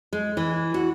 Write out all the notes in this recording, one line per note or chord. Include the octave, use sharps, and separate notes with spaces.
G#3
E3
F#4